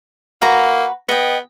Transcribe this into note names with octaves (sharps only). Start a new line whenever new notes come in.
A#3 F#4 B4 A#5
B3 D#5 G5